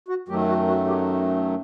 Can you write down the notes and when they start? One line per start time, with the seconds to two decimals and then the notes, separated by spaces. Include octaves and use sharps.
0.08 F#4
0.28 F#2 D#3 F#3 A3 G4
0.48 F#4
0.68 F#4
0.87 G4